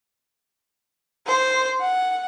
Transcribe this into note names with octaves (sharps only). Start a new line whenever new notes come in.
C5
F#5